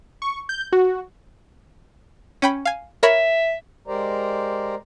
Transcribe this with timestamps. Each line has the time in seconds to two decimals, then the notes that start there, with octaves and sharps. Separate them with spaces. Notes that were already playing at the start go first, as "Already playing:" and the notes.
0.22 C#6
0.49 G6
0.73 F#4
2.42 C#4 G5 B5
2.65 F5 G#5
3.03 A#4 C#5 E5 B5
3.87 G#3 G4 A#4 C5 D5 A#5